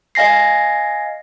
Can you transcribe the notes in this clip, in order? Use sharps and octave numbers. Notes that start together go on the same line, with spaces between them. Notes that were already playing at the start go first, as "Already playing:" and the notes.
D#5 F5 G#5 A#6 C7